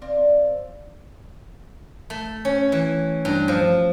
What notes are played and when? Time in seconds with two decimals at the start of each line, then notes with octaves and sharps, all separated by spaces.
0.02 C4 D5 F5
2.10 A3
2.45 C#4
2.72 E3
3.25 G2
3.48 F3